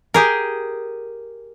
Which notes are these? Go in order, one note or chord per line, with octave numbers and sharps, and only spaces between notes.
G4 G#4 A#4